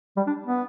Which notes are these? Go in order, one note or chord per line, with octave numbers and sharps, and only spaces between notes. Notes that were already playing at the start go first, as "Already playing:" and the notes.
G3
D4
B3